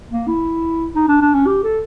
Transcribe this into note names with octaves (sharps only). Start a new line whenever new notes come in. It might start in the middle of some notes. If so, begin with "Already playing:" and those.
A#3
E4
D#4
D4
D4
C#4
G4
A4